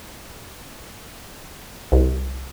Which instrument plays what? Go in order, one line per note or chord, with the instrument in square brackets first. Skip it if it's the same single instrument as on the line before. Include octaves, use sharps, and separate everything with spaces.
[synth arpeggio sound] C2